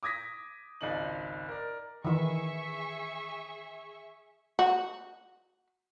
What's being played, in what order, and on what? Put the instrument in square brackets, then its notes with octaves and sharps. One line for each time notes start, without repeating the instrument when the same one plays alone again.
[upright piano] D6 D#6 G#6 A#6 B6
G#1 C#2 D#4 D5 F#7
A#4 D5
[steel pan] D#3 E3 [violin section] G#4 E5 C#6
[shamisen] F#4